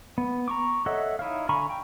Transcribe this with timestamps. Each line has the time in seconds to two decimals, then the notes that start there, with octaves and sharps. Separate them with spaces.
0.18 B3
0.48 A#5 C#6 D6
0.86 A4 C#5 D#5 E5 F#5
1.19 D#4 E4 C#5 F5
1.49 D3 G#5 A#5 B5 C#6
1.70 G5